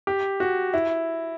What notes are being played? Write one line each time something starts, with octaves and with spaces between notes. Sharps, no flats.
G4
F#4
E4